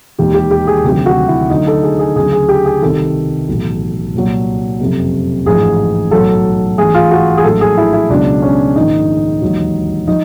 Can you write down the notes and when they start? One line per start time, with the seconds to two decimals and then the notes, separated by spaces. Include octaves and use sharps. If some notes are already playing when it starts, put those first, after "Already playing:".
0.18 E1 D#2 D#3 G4
0.34 G4
0.51 G4
0.67 G#4
0.84 D2 C3 D#3 F#3 G4
1.06 F#4
1.28 E4
1.50 D2 D3 F#3 D#4
1.67 A4
1.83 G#4
1.99 G#4
2.16 D2 C#3 F#3 G#4
2.32 G#4
2.48 G4
2.65 G#4
2.82 C2 C3 D#3 A4
3.49 B1 A2 E3
4.14 C2 A#2 F#3
4.80 F#1 F2 C3
5.46 A1 G#2 F3 G#4
6.11 B1 A2 F#3 A4
6.78 A1 G#2 E3 G#4
6.95 F4
7.11 F#4
7.37 G#4
7.43 A#1 A2 F#3 A4
7.61 G#4
7.77 E4
7.93 E4
8.09 C#2 B2 F#3 D4
8.42 C#4
8.76 A#1 G#2 D#3 D#4
9.42 E1 D#2 D#3 F#3
10.07 F3 D#4